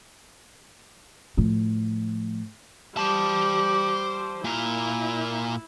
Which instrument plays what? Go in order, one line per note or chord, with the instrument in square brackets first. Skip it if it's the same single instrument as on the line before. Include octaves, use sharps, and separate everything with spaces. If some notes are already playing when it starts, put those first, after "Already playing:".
[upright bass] A2 F3
[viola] G3 D6 [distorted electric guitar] C5 A5
[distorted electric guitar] A#2 A#4 [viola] E4